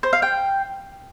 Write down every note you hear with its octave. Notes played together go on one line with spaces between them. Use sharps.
C5
F5
G5